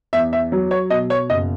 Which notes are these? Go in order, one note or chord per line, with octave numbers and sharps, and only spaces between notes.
E2 E5
E5
F#3
C#5
B2 D#5
C#5
F#1 D#5